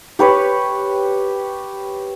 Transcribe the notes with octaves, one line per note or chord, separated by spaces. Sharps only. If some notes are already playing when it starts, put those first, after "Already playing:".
G4 B4 C#5